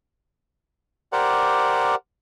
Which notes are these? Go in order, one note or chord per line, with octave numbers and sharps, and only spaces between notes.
G4 A#4 C5 D5 F#5